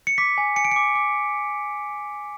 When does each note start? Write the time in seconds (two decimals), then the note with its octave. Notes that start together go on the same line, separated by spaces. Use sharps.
0.07 C#7
0.18 D6 B6
0.38 G#5
0.56 G#5 C#7
0.65 D7
0.71 D6 C#7
0.95 D6